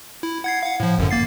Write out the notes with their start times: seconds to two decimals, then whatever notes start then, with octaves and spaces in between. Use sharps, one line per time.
0.23 E4
0.44 F#5 G#6 C7
0.63 F5 F#5
0.80 A2 F3
0.98 G#1 F#2 D3
1.11 A#3 A6 C7